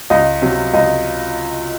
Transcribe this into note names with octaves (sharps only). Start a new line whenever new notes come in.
C#2 D#5
C3 F#3
C#2 D#5